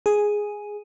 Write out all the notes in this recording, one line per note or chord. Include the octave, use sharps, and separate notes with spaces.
G#4